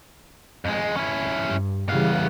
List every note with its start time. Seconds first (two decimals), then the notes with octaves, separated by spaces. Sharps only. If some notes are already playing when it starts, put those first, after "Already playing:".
0.65 F2 G#3
0.97 C#4 E4
1.47 G2
1.89 C#3 E3 G3 B3 F5